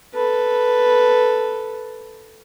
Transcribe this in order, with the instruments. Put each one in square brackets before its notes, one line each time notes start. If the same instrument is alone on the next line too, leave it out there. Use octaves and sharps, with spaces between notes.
[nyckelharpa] A4 B4